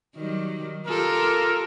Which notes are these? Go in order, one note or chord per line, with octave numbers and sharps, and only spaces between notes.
D#3 F#3 G3
F4 G4 A4 A#4